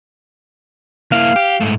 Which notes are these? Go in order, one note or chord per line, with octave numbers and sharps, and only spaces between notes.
A#3 E4 F5
G4
G#2 A3